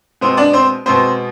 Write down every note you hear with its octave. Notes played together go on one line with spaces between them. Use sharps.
B2 G#3 B3 C4 C5
D4 D5
C4 C5
B2 G#3 B3 C4 C5